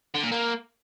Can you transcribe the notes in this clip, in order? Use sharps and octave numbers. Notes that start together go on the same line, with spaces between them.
D3
A#2
A#3